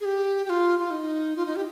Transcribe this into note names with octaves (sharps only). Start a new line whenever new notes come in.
G#4
G4
G4
F4
F4
D#4
F4
D#4
G4